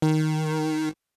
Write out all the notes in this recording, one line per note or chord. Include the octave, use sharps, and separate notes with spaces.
D#3